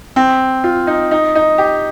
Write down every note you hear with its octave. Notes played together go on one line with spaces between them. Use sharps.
C4
F4
D#4
D#4
D#4
G4